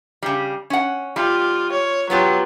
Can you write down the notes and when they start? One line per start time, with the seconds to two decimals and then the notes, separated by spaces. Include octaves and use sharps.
0.23 C#3 G3
0.70 C#4 F#5
1.16 G3 F4
1.72 C#5
2.10 F#3 B3 F4 G4